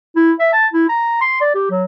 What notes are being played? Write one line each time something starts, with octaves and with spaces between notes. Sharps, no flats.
E4
E5
A5
E4
A#5
C6
D5
G4
F#3